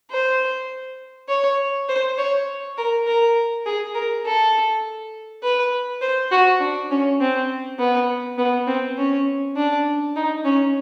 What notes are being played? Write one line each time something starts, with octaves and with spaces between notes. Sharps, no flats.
C5
C#5
C5
C#5
A#4
A#4
G#4
A#4
A4
B4
C5
F#4
D4
C#4
C4
B3
B3
C4
C#4
D4
D#4
C#4